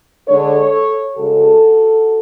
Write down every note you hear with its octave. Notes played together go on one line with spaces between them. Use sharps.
D3 G#3 D4 A4 C#5
C#3 G#3 C#4 F#4 A4